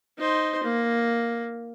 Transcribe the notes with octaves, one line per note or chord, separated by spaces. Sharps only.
D#4 C5
A#3